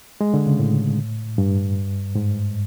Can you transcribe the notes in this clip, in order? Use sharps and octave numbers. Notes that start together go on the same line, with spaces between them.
G#3
D3
C#3
A2
G2
G#2